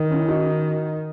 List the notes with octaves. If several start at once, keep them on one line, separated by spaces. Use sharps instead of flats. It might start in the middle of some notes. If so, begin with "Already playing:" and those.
Already playing: D#3
C#4 E4
D#4 F#4